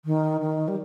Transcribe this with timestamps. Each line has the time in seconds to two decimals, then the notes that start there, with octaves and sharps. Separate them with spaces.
0.05 D#3
0.41 D#3
0.68 G3